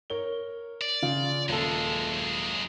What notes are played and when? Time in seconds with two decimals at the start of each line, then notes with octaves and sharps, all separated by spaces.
0.10 A#4 C#5 G7
0.81 D5
1.02 C#3 F4
1.49 D#1 F#2 G#3 A4